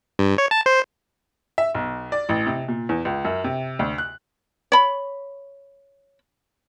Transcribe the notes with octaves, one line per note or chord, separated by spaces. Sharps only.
G2
C#5
A5
C5
E5
B1
D5
A1
C3
A#2
E2
C#2
F#2
C3
D2
F#6
C#5 B5